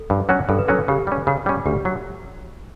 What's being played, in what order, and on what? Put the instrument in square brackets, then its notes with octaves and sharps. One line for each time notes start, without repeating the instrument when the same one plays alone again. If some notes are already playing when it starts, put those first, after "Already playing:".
Already playing: [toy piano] A4
[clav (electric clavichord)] G2
F#3 C#4 F#4
[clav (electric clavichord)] G2 [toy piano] A4
[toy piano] B4
[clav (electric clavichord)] F#3 C#4 F#4 [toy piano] A4
[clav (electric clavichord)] C#3 [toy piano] G4
[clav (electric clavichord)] G3 C#4
[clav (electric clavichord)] C#3 [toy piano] F#4
[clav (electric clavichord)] G3 C#4
[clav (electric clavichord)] D2 [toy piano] G4
[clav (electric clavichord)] F#3 [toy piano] F#4